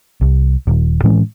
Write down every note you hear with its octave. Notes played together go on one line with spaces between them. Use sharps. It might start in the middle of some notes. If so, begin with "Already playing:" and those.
C2
D#1
A2 E3 G#3 C#4